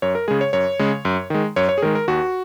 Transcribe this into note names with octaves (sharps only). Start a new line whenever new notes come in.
F#2 C#5
A#4
C#3 G#3 G#4
C#5
F#2 C#5
C#3 G#3
F#2
D#3 G#3
F#2 C#5
C#5
G#4
D#3 G#3 A#4
A#4
D#2 F#4